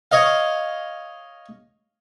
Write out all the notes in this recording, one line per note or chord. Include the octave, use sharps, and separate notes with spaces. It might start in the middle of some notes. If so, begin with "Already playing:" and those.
C#5 D#5 F5